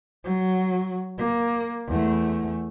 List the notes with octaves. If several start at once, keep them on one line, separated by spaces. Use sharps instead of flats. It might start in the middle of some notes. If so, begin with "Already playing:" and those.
F#3
A#3
E2 A3